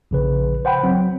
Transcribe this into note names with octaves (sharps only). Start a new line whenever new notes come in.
A#1 C#3 B4
C5 F#5 G5 B5
F#3 C4